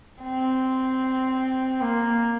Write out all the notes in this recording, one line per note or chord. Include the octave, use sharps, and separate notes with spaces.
C4
A#3